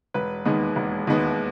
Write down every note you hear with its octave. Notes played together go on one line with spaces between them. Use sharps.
E1 B4
D#2 D#3 G#3 B3
E1
D#2 D#3 G#3 B3